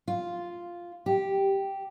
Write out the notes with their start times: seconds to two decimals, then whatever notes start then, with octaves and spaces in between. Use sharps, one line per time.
0.08 F4
1.06 G4